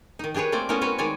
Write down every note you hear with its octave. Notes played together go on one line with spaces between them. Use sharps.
D#3 D#4
D4 G4 G#4 B4 C#5
A3 A#3 C4 D5
A3 B3 C#4 E4 F#4 A#4
C4 F#4 B4 C#5
D#3 G#3 C#5 D5 G#5